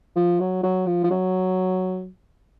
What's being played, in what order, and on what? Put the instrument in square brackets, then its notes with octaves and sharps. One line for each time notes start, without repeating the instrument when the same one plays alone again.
[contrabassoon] F3
F#3
F#3
F3
F3
F#3